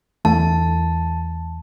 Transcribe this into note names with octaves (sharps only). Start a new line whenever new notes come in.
E2 E3 A3 A5